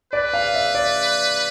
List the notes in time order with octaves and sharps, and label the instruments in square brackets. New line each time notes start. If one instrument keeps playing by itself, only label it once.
[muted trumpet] B4 [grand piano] D5
[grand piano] F5
E5
D5